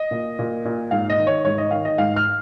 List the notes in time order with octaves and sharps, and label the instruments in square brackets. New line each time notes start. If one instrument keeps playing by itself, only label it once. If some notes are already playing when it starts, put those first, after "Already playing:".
Already playing: [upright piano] D#5
A#2
A#2
A#2
G#2 F5
D#5
D#3
C#5
G#2 C#5
D#5
D#3 F5
D#5
G#2 F5
F6